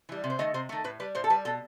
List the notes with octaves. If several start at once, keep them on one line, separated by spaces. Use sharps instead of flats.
E3 G3
C3
C5
D#3 A3 D#5
C3 C5
D#3 A3 A4
A2 B4
G3 B4
A2 C5
A4
G3 B4
B2 A4